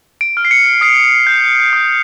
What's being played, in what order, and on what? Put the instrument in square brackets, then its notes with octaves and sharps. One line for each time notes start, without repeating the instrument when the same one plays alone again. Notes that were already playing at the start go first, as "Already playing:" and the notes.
[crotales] D7
F6
C7
C#7
D#6 C7
G6
D#6